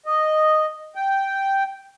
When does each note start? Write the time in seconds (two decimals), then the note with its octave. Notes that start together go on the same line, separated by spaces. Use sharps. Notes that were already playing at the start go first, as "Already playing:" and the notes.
0.06 D#5
0.95 G5